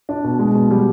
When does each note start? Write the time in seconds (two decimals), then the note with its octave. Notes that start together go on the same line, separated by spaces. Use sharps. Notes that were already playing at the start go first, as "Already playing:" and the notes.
0.09 D4
0.24 B2
0.39 G#3
0.55 B2
0.71 G3